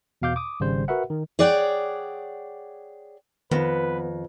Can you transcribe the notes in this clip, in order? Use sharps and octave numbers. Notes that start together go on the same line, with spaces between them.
E2 B2 F5 D6 G6
D6 D#6
G#1 C#3 G3 C5
F#4 A#4 B4 E5 F#5
D#3
G#4 C#5 D5 F#5 G5
F2 D#3 B3 B4